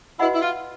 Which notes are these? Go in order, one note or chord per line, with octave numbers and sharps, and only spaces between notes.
E4 F#4 B4 D#5 F#5 B5
E4
F4